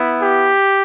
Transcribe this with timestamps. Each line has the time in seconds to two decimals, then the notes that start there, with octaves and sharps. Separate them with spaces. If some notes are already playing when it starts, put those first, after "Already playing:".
Already playing: B3 E4
0.18 G4